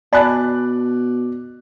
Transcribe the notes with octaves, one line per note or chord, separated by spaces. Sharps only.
B2 D5 G#5 A5 B5 F#6